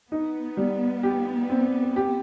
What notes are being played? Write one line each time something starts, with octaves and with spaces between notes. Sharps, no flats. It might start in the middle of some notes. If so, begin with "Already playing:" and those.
B3 D#4
G3
G4
C4
G4